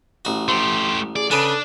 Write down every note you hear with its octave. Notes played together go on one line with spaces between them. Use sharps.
A1 F#4
A3 G4 C6
G#4 D5
C#3 D4 A4 B4 G#5